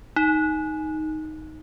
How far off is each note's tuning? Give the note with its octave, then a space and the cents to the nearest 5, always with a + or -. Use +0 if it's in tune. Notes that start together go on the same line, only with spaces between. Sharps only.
D#4 +5